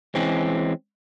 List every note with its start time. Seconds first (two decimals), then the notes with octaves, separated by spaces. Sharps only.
0.15 E3 G#3 C4 C#4